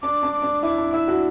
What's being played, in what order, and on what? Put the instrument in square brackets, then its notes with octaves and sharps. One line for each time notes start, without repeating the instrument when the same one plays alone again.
[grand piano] D4 [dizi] D6
[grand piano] D4
[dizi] D6
[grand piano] D4
[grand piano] E4 [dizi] D6
[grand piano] D4
[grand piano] E4 [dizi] E6
[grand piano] D4 F#4